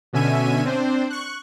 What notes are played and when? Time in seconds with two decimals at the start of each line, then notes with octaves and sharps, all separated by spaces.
0.13 B2 D3 C#4 E5 G#5 D#7
0.65 C4 D4 C5
1.10 C#6 F#6